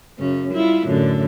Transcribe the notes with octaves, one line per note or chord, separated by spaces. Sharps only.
F#2 C#3 C#4
G3 E4 F4
F#2 A2 D3